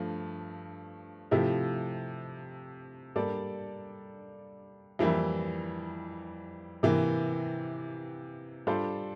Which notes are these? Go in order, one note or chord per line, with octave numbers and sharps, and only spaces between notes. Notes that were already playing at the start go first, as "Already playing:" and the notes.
Already playing: G2 F3 A3
C3 F3 A3 E4 G4
G3 A#3 D4 A4 D5
F2 E3 G3 A#3 E4
C3 E3 A#3
G3 D4 F4 A4 C5